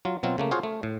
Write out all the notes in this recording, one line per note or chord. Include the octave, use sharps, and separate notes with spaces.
F#3 F4
B2 F#3 C4 F4
C#3 A3 A#3
F4 F#4 G#4 C5 C#5 F5
A3
A2